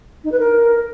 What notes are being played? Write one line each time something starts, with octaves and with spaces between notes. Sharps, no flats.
D#4
B4
A#4